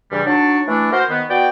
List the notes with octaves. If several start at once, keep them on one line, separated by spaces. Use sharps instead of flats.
G2 C#3 E3 G3
F#3 D4 D#4 A5 C#6
E3 A3 D4
F#4 A#4 C5
D#3 B3
B3 F#4 D5 G5